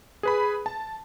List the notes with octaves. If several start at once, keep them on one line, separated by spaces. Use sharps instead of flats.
G#4 B4 B5
A5